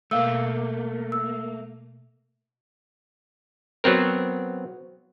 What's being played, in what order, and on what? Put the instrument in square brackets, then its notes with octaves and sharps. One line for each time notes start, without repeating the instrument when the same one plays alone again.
[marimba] B2 F5 E6 [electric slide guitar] A3 A#3
[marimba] E6
[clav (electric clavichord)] F#3 B3 C4 A#4